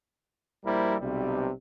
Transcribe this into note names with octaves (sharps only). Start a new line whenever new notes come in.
A#1 G3 A#3 E4 A#4 C5
B1 C3 G3